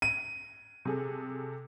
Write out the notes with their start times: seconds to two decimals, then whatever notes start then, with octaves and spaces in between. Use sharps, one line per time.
0.02 D#7
0.85 C3 G#4 A4